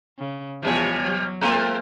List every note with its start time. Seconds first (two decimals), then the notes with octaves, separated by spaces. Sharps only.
0.18 C#3
0.63 E2 C3 F3 G3 C#5
1.03 F#3
1.41 G#3 A#3 C4 F4 A#4